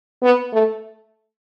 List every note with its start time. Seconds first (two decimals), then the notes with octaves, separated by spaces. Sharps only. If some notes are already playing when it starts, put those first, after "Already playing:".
0.23 B3
0.53 A3